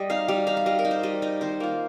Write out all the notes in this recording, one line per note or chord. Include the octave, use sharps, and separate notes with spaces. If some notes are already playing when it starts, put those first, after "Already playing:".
Already playing: G3 D#5
D#4 F5
G3 F5
D#4 F5
F5
G3 D#5
A#4
D#4
C5
G3 D#5
D#4 D#5
D#3 C5
A#3 F4